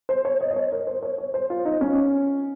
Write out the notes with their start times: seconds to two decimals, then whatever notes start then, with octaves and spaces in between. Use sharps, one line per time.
0.09 C5
0.25 C#5
0.41 D#5
0.51 D#5
0.56 C#5
0.72 A#4
0.87 C5
1.03 C#5
1.18 C#5
1.34 C5
1.50 F4
1.65 D#4
1.81 C#4